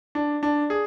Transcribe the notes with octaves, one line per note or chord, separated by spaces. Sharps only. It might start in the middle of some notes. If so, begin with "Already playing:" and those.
D4
D4
G#4